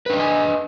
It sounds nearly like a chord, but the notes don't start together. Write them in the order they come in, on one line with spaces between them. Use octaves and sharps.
B4 D4 D5 D#5 G#5